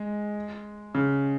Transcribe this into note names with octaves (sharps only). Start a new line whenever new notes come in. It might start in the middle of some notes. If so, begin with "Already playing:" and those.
Already playing: G#3
C#3